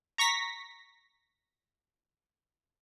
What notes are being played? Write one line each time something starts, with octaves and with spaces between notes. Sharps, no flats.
A#5 C#6 A#6 B6